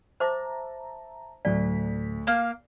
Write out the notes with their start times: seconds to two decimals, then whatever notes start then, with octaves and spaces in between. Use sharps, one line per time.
0.20 C5 E5 A5 A#5 D6
1.45 D2 A2 F#3 D5 B6
2.27 A#3 F5